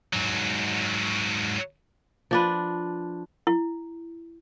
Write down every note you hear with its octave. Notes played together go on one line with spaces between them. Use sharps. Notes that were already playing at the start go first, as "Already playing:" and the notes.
G#2 F#3
F3 D4 B4
E4